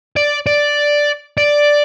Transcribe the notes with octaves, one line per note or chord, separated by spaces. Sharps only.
D5
D5
D5